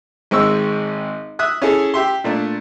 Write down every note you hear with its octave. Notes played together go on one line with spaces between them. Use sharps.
G#1 G#3 C4 C#6 E6
E5 D#6 F#6
C#4 E4 G#4 A4
G4 E5 C6
A#2 A3 D4